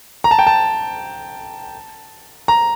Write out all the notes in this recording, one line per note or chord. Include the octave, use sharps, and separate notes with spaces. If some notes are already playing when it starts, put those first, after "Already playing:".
A#5
A5
G5
A5
A#5